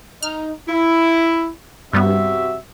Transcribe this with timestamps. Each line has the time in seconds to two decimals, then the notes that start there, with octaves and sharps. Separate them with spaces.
0.23 D#4 F6
0.68 E4
1.93 G2 C3 G3 B3 F#4 E5